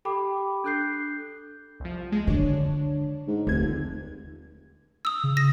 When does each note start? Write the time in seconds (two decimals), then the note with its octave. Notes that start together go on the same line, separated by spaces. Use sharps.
0.05 G4 A4 G5 B5 D6
0.64 D4 A4 F#6 G6 C7
1.80 C2 F3
2.12 G#3
2.27 D3 D4 C#5
3.28 G#2
3.47 F1 D#2 D3 G#6
5.05 D#6 E6
5.24 C#3
5.37 A#6